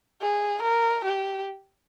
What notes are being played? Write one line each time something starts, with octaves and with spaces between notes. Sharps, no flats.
G#4
A#4
G4